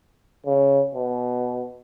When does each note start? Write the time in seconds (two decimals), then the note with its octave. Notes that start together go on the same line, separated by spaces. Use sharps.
0.46 C#3
0.95 B2